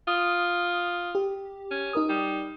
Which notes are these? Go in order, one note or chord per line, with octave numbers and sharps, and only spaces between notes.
F4 D#6
G4
C#4
D#4 A#4 D#6
G3